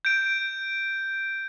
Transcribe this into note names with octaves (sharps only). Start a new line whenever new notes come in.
G6 D7